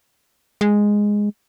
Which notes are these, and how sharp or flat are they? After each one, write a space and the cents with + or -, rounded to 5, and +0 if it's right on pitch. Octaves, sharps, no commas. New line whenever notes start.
G#3 -5